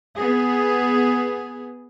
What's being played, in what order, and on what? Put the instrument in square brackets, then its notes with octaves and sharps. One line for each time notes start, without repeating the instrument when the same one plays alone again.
[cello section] B3 G#4